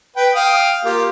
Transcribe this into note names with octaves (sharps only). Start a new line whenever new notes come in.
B4 G5
F5 G5 D#6
A#3 F4 G4